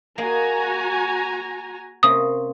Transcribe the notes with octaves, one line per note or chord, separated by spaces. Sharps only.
A#3 F#4 G#4 D#5 G#5 A#5
C3 A#3 C#4 D#6